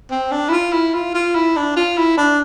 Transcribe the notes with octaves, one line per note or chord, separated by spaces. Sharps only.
C4
D4
E4
F4
E4
F4
F4
E4
D4
F4
E4
D4